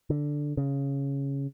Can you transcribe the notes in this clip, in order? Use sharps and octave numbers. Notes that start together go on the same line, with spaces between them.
D3
C#3